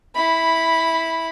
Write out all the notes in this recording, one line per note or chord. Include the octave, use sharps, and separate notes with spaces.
E4 B5